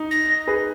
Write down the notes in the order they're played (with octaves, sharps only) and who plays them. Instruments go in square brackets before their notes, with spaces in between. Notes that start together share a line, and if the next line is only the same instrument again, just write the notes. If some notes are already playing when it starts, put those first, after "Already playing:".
Already playing: [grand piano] D#4
[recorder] A#6
[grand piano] G#4 B4